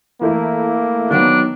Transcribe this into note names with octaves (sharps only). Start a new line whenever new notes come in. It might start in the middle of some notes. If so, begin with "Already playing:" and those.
E3 A3 A#3 E4
D#3 F#3 B3 D4